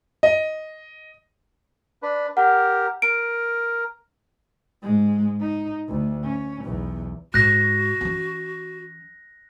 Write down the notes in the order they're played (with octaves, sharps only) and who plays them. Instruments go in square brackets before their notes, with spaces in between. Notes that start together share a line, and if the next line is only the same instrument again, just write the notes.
[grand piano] D#5
[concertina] D4 B4
[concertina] G4 A#4 [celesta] F#5
[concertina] A#4 [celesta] D7
[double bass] G#2 G#3
D#4
D2
C#4
B1 E2
[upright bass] G#2 [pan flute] F#4 [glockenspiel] F#6 A#6
[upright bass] E3 C#4